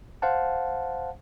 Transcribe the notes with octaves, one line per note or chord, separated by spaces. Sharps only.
C5 F5 F#5 A5